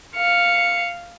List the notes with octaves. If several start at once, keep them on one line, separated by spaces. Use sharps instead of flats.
F5 C#7